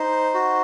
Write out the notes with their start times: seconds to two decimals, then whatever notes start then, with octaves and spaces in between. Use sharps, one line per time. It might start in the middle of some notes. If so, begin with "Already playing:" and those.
Already playing: D#4 C5
0.34 F#4